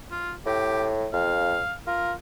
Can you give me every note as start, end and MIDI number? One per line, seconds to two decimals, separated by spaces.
0.11 0.32 65
0.46 1.08 45
0.46 0.87 67
1.13 1.60 41
1.13 1.72 77
1.87 2.13 65
1.87 2.12 70